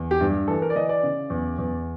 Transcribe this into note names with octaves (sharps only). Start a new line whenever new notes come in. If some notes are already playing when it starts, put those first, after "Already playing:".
Already playing: E2
G4
G2
E3 A4
A#4
D5
E3 D#5
D5
C#3
E2
E2